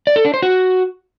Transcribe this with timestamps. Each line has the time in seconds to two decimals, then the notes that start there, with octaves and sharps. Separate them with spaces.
0.07 D5
0.16 A4
0.25 D4
0.34 C5
0.42 F#4